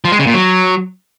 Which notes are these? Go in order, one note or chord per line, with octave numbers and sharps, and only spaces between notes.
F3
G#3
C#3
A#2
F#3